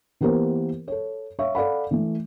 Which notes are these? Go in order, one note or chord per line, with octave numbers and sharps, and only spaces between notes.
E3 A#3 B3 G4 A#4 C5
A4 C#5
C#5 E5 F5 C#6
A4 D5 F5 F#5 B5
E3 A3